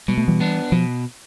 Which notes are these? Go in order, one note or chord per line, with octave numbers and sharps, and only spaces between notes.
B2 G3
A3
E3 G3
B3 D4
B2 F3